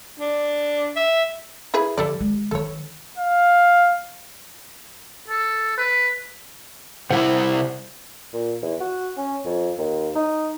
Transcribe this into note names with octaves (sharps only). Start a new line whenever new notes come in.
D4
E5
E4 G#4 B4
D3 F3 G4 A4 D5
D#3 G#3
D#3 E3 A4 C#5
F5
A4
B4
C3 G3 E4 C5 F#5
A#2
E2
F#4
C#4
F2
D#2
D#4